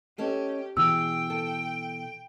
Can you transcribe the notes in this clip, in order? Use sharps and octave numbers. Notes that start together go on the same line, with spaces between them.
C#4 G4 A4 D#5
B2 E3 G#4 G5 E6
A4